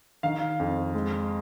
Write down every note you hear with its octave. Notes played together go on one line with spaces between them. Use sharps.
D#3 F5
F2
G#3